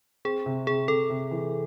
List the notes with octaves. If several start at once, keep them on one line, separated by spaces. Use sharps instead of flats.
C4 G#4
C3
C3 G#4
C3 A4
C3
E3